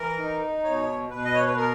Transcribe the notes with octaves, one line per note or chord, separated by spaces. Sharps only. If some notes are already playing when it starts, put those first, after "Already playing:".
Already playing: E3 A#4
D#4
B2 C#5
B2 B4
D#5
C#5
B4
B3 A#4